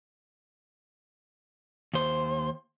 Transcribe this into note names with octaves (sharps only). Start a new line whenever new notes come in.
D#2 C5